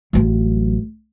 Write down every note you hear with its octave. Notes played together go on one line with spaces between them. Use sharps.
A1 F#3